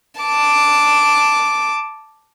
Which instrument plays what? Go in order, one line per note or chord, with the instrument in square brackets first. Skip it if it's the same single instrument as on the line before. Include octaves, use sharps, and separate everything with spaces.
[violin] A5 D6